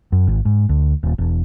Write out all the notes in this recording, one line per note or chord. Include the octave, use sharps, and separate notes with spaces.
F#2
G#1
G#2
D2
D#1
E1